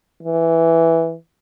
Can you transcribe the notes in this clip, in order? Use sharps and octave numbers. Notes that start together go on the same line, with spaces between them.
E3